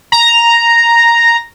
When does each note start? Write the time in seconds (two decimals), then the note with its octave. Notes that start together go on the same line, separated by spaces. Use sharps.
0.12 A#5